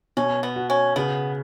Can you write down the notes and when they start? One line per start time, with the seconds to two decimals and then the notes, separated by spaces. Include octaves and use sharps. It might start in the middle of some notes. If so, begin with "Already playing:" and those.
0.17 B2 C#4
0.43 B3
0.56 F#4
0.70 C#4
0.96 C#3 B3